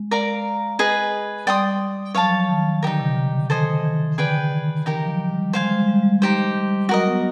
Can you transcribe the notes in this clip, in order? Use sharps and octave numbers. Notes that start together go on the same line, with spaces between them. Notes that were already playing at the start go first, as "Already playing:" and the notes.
Already playing: G#3
A#4 D5 F5 A#5
G#4 B4 D#5
G3 D5 G5 C6 D#6
F#3 C#5 F5 A5
F3
F#3
D#3
D3 D#4 G4 A#4
C3
C#3
D3
D#3 A4 C5 D#5 G#5
E3
D#3
D3 G#4 B4 D5 G5
D#3
E3 D#4 G4 A#4
F3
F#3
G3
G#3 C5 F5 G#5
G3
G#3
G3
G#3
G3
D#4 G4 C5
G3
F#3 F#4 A#4 D#5
B3